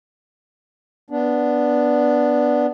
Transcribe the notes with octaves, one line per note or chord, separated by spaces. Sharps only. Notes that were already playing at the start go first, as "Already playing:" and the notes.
B3 D4